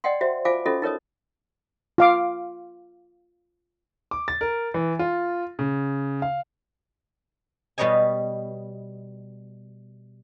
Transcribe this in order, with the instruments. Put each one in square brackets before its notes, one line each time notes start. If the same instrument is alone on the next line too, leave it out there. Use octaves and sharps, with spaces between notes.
[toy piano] D5 D#5 F#5 G5 C6
F#4 C5 E5
F4 C5 F5 G#5 D6
C#4 F4 F#4 A4 D#5
D#4 A#4 C#5 D#5 D#6
[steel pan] F4 F5 D6
[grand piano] D6
A6
A#4
E3
F4
C#3
F5
[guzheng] B2 G3 B4 C#5 D#5 G#5